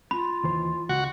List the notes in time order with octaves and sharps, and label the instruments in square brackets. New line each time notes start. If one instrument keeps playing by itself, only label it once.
[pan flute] F4 [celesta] B5
[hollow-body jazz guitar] D#2 E3 C5
[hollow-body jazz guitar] C#2 [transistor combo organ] F#4